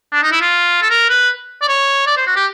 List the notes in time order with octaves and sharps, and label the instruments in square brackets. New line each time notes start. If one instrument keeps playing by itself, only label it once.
[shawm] D4
D#4
E4
F4
A4
A#4
B4
D5
C#5
D5
C5
F#4
G4